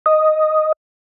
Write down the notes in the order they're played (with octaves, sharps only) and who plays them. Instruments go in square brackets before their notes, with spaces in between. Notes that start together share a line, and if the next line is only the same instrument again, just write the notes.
[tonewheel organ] D#5